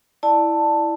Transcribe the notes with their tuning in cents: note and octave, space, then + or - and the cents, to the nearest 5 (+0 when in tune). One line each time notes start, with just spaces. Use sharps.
E4 +0 D5 +10 A5 +10